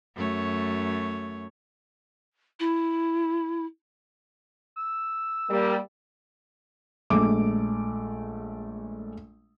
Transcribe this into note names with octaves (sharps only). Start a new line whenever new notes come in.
F#2 A3 C#5
E4
E6
G3 A#3
A#1 G#3 A3 D6